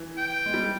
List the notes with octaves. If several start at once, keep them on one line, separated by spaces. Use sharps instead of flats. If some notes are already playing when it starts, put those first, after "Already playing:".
Already playing: E3
G5
G#3
G3